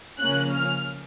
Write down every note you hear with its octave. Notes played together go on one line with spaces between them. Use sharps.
C#3 F3 A#3 C#4 F#6
F6